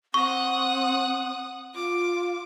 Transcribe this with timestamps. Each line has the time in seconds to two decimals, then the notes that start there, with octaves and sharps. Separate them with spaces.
0.14 C4 F#5 C#6 D#6
1.75 F4 D6